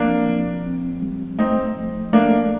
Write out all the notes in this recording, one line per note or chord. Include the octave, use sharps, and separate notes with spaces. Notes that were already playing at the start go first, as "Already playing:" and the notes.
Already playing: F3 A#3 C4 D4
F3
C4
G3
A3 C4 D#4
F3
A3 A#3 D4